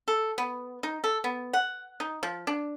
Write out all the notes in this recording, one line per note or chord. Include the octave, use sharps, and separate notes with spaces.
A4
B3
D#4
A4
B3
F#5
D#4
F3
D4